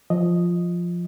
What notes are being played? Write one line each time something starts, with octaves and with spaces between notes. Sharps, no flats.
F3 D#5